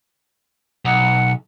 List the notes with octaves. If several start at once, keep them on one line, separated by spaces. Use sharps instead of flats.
B1 F#5